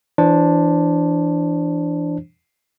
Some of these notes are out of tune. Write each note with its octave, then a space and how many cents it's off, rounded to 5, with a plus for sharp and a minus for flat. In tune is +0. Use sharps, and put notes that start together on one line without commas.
E3 +15 D4 +0 C5 +25